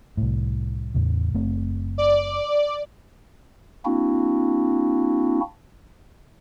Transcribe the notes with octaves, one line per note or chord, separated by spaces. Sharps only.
C2 A2
E2 A2 C#3
F#1 A3 C4
D5
A#3 C4 D4 E4 F#4